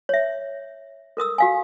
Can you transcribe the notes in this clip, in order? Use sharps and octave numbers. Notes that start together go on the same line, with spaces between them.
C#5 E5
A4 A#4 D#6 E6
F#4 F5 G#5